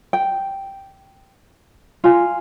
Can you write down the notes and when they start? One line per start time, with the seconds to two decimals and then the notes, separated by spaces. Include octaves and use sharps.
0.13 G5
2.04 F4 G#5